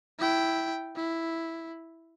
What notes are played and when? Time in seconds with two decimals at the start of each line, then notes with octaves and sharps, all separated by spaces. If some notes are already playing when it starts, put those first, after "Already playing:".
0.19 E4 G5
0.96 E4